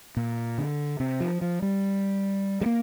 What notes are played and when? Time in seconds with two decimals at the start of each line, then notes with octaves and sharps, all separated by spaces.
0.17 A#2
0.58 D3
1.00 C3
1.20 F3
1.41 F3
1.62 G3
2.61 G3
2.66 A#3